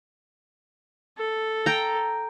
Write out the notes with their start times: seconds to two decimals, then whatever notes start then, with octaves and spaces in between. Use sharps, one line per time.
1.18 A4
1.66 G5 A#5